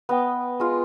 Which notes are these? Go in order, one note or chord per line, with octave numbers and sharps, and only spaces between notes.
B3 D#5 G5
G#3 F4